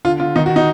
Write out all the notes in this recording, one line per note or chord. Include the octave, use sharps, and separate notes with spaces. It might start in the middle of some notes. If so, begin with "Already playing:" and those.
D3 F4
D3 F4
D#3 D#4
F#4
D#4